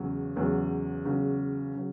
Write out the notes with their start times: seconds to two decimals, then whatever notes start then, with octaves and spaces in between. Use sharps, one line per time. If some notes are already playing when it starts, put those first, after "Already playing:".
Already playing: E2 C#3 F#3
0.36 E2 C#3 F#3
1.05 E2 C#3 F#3
1.75 C#3 F#3